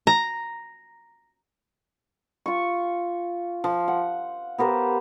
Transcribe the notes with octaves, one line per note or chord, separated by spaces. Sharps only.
A#5
F4 C#6
F3
F#5
B3 G4 A#4 C5